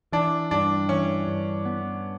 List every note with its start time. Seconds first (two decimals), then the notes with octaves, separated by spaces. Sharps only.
0.12 E3 D4
0.51 G2 D4
0.89 E3 C#4
1.27 G2
1.65 B3